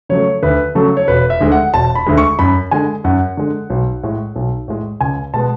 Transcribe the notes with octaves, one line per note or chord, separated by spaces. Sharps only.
C#3 F#3 A3 C#5
D2 B4
C#3 F#3 A3 A4
C#5
E1 B4
E5
D2 D3 G#3
F#5
E1 A5
B5
D2 D3 G#3
C#6
F#2 B5
D3 G#3 G#5
F#2 F#5
D3 G#3
B1
A2 G#3
B1
A2 G#3
C#2 G#5
B2 G#3 B3 A5